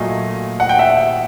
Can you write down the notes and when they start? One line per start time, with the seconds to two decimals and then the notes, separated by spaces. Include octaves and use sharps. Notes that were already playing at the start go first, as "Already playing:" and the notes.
Already playing: A#2 F#3 A3 D#5 F5
0.60 F#5
0.69 G5
0.79 E5 F#5